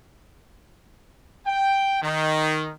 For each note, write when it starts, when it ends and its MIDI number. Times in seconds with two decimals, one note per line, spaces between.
1.47 2.00 79
2.02 2.71 51